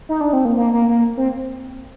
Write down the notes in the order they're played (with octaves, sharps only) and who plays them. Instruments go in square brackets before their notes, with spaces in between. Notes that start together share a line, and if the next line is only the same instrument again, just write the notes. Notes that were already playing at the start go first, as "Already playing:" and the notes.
[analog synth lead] D#4
D4
C4
A#3
A#3
A#3
A#3
C4